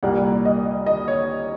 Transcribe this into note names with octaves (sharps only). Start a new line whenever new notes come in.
C2 A#2 G3 A#3 F#5
D#5
D#5
C#5